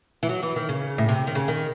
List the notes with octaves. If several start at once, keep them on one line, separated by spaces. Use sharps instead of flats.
E3
F#3
E3
D#3
C#3
A2
C3
D#3
C#3
D#3